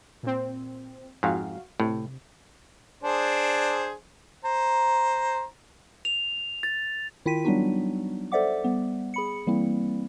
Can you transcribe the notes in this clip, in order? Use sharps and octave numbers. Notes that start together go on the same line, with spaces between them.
A#2 C4
F2 G#2 F#4 F5
A2 C3
D4 G#4 C5
C5 A#5
F7
A6
D#3 E4 F4 G5 B6 D#7
F#3 G3 B3 D4 D#4 F#4
A4 C5 D5 E5 F#5 D6
G3 B3
G#4 B5 C#7
E3 G3 A#3 C4 E4